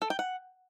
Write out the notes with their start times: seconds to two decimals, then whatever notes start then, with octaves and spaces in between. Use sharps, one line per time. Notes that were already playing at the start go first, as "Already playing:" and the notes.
0.02 A4
0.10 G5
0.19 F#5